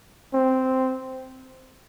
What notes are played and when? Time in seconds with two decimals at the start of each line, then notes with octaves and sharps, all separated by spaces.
0.33 C4